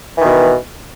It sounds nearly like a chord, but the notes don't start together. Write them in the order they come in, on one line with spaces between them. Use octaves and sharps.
E3 D#3 B2